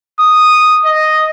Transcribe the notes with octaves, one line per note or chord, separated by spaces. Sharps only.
D#6
D#5